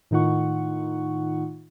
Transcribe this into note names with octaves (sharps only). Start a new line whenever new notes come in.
A2 D#3 D#4 F4 F#5 C#6